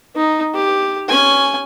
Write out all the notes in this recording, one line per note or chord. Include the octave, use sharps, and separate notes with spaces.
D#4
G4
C#4 G#5